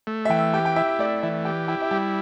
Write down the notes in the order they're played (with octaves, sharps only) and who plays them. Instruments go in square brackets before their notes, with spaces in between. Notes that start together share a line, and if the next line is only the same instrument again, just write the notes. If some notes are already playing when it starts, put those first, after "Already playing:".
[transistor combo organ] A3
[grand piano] E5
[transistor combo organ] E3 [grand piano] G5
[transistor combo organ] G4 [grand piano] G5
[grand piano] G5
[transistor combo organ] E4 [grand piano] E5
[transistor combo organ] A3 [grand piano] D5
[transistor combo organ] E3 [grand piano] E5
[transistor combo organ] G4 [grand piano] G5
[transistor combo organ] E4 [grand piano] G5
[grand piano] E5
[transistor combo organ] G3 [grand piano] G5